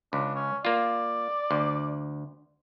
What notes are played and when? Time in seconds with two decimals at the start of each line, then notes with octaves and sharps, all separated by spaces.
0.13 C#2 D4
0.35 C#4
0.65 A#3 F4 D5
1.51 D2